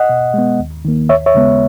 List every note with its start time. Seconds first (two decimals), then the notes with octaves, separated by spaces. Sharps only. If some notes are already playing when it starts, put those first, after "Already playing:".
Already playing: D#5 F#5
0.09 B2
0.34 G#3 B3
0.59 D#2
0.85 D#3 A#3
1.09 D#2 C#5 E5
1.26 C#5 E5
1.35 C#3 G#3 B3